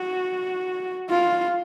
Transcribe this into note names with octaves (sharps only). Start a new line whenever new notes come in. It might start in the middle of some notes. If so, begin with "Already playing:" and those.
Already playing: F#4
F4